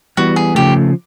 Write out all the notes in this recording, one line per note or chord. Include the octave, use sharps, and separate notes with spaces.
E3 G3 B3 F#4
G#4
C#3 F3 A3 G4